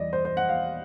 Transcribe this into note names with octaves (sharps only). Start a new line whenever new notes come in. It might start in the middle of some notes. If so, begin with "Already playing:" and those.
Already playing: E2 G3 D5 D#5
C5
C5
F#5
F5